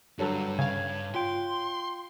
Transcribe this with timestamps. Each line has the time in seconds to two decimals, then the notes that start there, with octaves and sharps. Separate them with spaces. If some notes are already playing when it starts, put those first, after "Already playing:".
0.19 G2 D3 F#3 A4
0.59 C#3 C#4 F5 G#6
1.14 F4 G5 C6